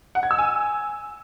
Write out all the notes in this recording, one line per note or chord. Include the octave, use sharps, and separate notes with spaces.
F#5
G#6
E6
G#5